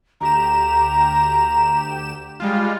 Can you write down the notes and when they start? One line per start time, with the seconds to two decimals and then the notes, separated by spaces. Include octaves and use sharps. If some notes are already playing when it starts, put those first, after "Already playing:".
0.21 D2 G4 A#5 E7
2.40 G3 G#3 F4